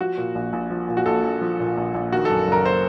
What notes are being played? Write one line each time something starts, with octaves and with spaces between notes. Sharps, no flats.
F3 F#4
A#2
A#1
A#1
F3
A#2
F#4
A#1 A4
A#1
F3
A#2
A#1
A#1
D#3 F#4
F#2 A4
F#1 A#4
C5